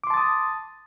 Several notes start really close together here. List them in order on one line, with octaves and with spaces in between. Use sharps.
D6 C6 A5 A6 D#6